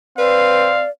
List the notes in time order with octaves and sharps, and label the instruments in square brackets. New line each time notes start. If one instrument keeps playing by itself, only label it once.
[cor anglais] C4 [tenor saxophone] B4 [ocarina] D5 [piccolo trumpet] F5